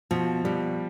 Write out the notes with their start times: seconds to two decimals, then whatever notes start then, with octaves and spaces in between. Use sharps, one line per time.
0.11 B2 F3
0.45 B2 G3